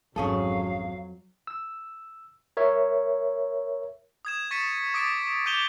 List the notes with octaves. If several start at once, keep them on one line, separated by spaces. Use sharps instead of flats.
G#1 F2 F#3 C#4 G#4 A4 F5
E6
A#4 C#5 E5
D#6 G#6 E7
C#6 A6 B6 C#7 D#7 E7
D6 D#6 A6 B6 D7
D6 G6 D#7 F7 G7